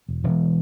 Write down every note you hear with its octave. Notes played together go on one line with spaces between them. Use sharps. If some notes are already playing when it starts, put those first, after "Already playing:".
E1
E1